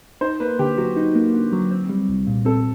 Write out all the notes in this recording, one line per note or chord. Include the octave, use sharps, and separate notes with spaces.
D#4 C5
A#3 B4
D3 G4
F#3 F#4
D#4
A#3
D3
F#3
C4
G3
C2
A#2
C4 A4